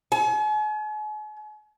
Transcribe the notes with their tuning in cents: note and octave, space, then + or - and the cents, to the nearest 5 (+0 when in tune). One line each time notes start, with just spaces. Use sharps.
G#5 +45